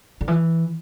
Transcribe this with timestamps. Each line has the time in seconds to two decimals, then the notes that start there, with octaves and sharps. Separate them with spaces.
0.21 D3
0.28 E3